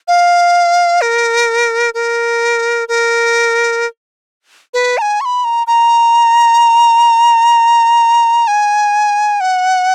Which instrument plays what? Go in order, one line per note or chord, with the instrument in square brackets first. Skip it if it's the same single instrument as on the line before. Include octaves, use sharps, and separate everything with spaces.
[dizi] F5
A#4
A#4
A#4
B4
A#5
G#5
C#6
B5
A#5
A#5
G#5
F#5